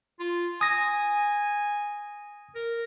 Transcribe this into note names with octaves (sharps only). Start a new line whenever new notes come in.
F4
G#5 D#6 A#6
A#4